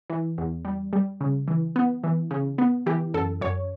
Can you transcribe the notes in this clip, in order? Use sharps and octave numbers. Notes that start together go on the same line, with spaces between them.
E3
E2
G3
G3
C#3
E3
B3
E3
C#3
B3
E3 G4
F#2 A4
F#2 C#5